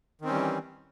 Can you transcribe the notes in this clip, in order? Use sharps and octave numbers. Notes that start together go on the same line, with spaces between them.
D#3 E3 G3 C4 C#4